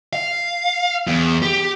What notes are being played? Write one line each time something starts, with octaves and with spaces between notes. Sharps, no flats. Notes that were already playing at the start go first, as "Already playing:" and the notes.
F5
E2
G4